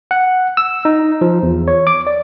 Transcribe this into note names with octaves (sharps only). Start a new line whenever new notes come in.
F#5
E6
D#4
F3
E2
C#5
D6
D5